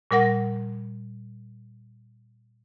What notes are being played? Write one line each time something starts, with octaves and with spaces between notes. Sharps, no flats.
A#2 G3 A#4 F#5 A#6